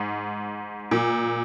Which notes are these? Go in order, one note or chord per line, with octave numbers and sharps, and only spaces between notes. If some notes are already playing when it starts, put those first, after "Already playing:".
Already playing: G#2
A#2